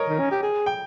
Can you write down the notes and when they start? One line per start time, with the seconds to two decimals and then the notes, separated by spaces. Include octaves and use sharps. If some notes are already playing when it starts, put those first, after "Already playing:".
Already playing: A#4 C#5 D#5
0.09 D#3
0.19 C#4
0.31 G4
0.43 G#4
0.66 G5